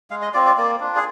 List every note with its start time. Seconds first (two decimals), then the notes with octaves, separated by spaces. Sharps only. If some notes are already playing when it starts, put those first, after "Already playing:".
0.10 G#3 F5
0.22 D#5
0.34 C4 F4 D5
0.46 D5
0.57 A#3 D5
0.80 D4 F4
0.96 G#4